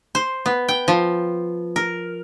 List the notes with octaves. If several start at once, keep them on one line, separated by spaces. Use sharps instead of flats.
C5
B3
G5
F3
A#4